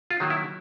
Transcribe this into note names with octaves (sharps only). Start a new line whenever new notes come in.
F4
D#3 F#3 A#3
E4